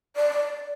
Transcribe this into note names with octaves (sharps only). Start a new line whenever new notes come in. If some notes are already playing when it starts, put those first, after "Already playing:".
D5